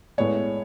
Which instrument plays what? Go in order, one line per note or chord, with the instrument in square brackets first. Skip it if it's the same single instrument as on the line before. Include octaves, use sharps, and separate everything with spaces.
[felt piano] A2 G#3 B3 C#5